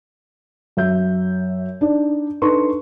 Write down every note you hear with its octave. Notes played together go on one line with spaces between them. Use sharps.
F#2 E5 G6
D4 D#4 D5
D4 D#4 A4 B4 C6 C#6